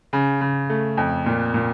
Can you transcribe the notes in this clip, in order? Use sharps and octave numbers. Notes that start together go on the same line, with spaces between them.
C#3
C#3
A3
F2
A#2
A#2